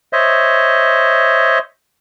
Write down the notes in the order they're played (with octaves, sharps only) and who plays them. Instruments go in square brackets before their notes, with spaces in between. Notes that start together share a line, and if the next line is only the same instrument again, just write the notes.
[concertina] C5 C#5 D#5 E5